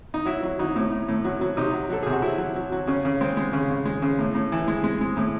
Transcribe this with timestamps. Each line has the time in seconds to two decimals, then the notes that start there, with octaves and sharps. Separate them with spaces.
0.14 D#4
0.26 F#3 E4
0.43 F#3
0.59 F#3 D#4
0.76 A2
0.91 A2
1.08 A2
1.24 F#3
1.41 F#3
1.57 C3 D#4
1.73 F#3
1.90 F#3 A4
2.03 C3 G#4
2.12 F#4
2.22 F#3 E4
2.38 F#3
2.55 F#3
2.72 F#3
2.87 C#3 C#4
3.05 C#3
3.21 G#3 C4
3.37 G#3
3.53 C#3 C#4
3.70 C#3
3.86 G#3
4.02 C#3
4.19 A2
4.35 A2
4.52 E3
4.68 G#3
4.84 G#3
5.01 G#3
5.17 A2